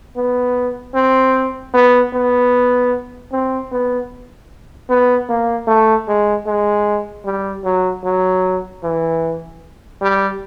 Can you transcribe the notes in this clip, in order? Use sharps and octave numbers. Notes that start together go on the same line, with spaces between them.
B3
C4
B3
B3
C4
B3
B3
A#3
A3
G#3
G#3
G3
F#3
F#3
E3
G3